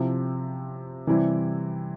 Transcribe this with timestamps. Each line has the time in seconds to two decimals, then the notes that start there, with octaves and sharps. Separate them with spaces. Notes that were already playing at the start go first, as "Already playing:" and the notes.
Already playing: C3 F3 C4 E4
1.07 C3 E3 G3 C4 E4